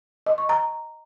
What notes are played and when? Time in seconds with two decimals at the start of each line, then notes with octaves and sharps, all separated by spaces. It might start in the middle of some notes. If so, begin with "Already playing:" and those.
0.27 D#5
0.38 C#6
0.49 A#5